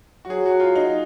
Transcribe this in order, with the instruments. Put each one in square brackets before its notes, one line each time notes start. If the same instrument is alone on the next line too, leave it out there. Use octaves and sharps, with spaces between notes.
[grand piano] F#4
[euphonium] F#3 [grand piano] G#4
[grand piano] F#4
F4
D#4